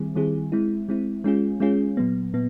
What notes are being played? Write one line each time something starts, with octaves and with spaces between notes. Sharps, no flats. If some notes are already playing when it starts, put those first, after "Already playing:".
Already playing: D#3 G3 C4 E4 G#4
D#3 G3 C4 E4 G#4
G#3 C4 E4
G#3 C4 E4
G#3 C#4 F4 G#4
G#3 C#4 F4 G#4
A#2 F#3 B3
A#2 B3